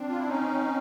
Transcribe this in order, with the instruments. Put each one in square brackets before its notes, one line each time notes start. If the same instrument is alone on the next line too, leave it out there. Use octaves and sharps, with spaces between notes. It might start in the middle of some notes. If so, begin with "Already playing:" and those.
Already playing: [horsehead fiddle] C4 [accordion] D4
[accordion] F4
E4
C#4 D#4